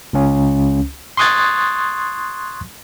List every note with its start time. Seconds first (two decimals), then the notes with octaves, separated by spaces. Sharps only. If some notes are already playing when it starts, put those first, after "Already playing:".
0.13 C#2 C#4
1.17 C6 C#6 D#6 F#6 G#6 A6